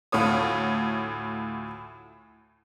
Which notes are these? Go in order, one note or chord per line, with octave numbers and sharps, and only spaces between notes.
D2 A2 F4 C#5 D#6